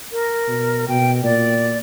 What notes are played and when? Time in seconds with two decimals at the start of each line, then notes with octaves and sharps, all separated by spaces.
0.12 A#4
0.48 B2
0.88 B2 G5
1.24 A#2 D5